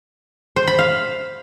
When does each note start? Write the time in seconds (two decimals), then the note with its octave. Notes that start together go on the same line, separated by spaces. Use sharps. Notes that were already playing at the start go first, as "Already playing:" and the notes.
0.56 C5
0.67 B5
0.79 F5